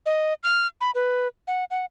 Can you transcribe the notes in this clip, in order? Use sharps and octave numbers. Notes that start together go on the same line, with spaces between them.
D#5
F6
B5
B4
F#5
F#5